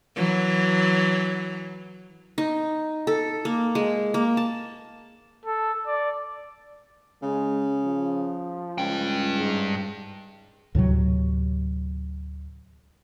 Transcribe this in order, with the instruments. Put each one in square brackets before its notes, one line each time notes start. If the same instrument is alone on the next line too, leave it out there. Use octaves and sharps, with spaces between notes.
[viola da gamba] E3 F#3
[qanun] D#4
A4
A#3
G#3
A#3
A5
[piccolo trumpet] A4
D5
[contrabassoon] C#3 [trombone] G#3
[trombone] F3
[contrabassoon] C#2 [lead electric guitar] G2 G5
[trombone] G#2
[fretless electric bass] D2 A2 C3 F#3